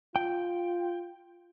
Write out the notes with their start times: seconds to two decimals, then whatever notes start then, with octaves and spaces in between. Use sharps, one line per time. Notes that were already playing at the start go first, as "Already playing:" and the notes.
0.16 F4 G5